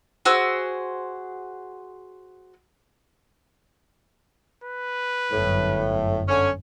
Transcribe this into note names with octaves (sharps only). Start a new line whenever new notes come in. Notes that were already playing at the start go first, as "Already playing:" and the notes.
F#4 G#4 C5 E6
B4
G1 F#2 A2
D3 C#4 G#5